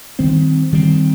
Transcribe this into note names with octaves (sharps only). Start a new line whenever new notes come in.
D#3 G3 C4
D#3 G3 C4